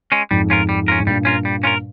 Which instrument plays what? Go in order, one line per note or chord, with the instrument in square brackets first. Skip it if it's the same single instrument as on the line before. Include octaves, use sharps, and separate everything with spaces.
[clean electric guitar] G#3 C#4
[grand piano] F2 G#2 [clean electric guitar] G3
[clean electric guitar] C#4 F4 A#4
G3
C#4 F4 A#4
[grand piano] G#2
[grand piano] G2 A#2 [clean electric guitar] G3
[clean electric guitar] C#4 F4 A#4
G3
C#4 F4 A#4